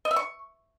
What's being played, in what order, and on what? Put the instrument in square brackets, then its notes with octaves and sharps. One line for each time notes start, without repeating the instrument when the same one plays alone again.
[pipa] D#5
E5
C#6